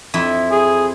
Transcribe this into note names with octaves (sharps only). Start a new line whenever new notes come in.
F2 E4
G#4